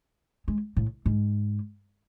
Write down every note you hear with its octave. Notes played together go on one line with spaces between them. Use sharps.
G#3
A2
G#2